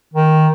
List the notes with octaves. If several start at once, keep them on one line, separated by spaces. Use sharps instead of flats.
D#3